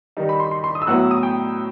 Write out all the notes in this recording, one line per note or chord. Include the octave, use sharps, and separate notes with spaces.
D#3 G3 D#4
B5
C6
C6
C6
D#6
E6
A2 F#3 B3 E4 F#6
E6
D#6
G5